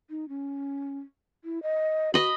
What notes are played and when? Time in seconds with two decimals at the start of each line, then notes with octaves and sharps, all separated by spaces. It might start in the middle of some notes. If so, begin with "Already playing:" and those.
0.10 D#4
0.29 C#4
1.44 E4
1.63 D#5
2.14 F#4 D#5 B5